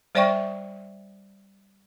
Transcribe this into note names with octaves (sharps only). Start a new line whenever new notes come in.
G3 C5 D5 E5 G5 C#6